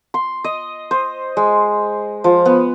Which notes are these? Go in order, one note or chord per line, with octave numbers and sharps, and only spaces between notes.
C6
D#5
C5
G#3
F3
B3